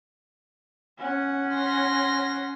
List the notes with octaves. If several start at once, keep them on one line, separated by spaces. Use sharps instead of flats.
C#4 F#5
C6 A#6